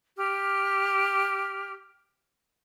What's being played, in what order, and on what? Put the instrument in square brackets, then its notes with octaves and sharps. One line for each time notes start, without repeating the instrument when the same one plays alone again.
[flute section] G4 F6